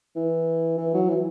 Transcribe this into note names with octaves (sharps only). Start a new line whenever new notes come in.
E3
E3
F#3
E3